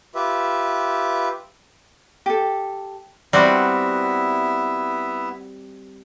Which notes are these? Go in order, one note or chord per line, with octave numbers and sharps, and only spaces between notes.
F4 G4 B4 E5
G4 A4
G3 B3 C4 E4 F#4 E5